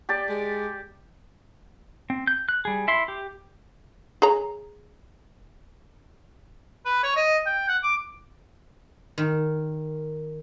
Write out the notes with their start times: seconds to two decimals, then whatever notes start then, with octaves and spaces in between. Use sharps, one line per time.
0.09 G4 D5 A5
0.29 G#3
2.10 C4
2.27 G6
2.49 F#6
2.65 G3 G#4
2.88 E4 E5 C6
3.08 G4
4.22 G#4 C#5 A#5
6.85 B4
7.03 C#5
7.16 D#5
7.46 G5
7.68 F#5
7.83 D6
9.18 D#3